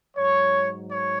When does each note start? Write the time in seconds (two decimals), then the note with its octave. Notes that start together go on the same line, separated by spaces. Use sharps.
0.16 G#2 F#3 C#5
0.89 C#5